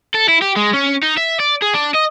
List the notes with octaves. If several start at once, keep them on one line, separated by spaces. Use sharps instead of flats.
A4
E4
G4
G#3
C#4
D#4
E5
D5
G#4
D4
D#5